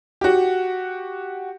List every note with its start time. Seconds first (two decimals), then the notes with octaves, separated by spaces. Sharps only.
0.21 F#4 G4